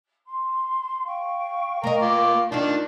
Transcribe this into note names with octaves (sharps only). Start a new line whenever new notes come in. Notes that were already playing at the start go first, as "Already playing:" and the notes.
C6
F5 G5 C#6
A#3 A#4 D#5
F4 D6
D#3 D4 F4 F5